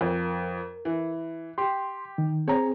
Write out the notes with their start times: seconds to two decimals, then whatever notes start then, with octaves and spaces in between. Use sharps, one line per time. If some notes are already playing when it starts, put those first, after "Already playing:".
0.01 F2 A#4
0.85 E3
1.58 G4 C6
2.18 D#3
2.48 C4 G#4 C#5 A#5